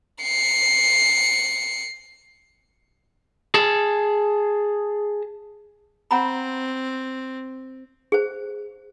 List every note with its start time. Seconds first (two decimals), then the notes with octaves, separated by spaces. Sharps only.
0.22 C7 C#7
3.54 G#4 A5
6.11 C4 F#5 A#5 B5
8.12 G#4 C5